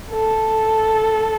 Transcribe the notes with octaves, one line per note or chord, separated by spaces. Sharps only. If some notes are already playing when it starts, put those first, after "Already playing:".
A4